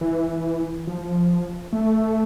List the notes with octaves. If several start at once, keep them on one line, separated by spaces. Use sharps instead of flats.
E3
F3
A3